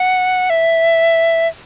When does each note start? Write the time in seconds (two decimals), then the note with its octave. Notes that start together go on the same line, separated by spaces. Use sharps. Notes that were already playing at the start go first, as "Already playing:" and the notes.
Already playing: F#5
0.50 E5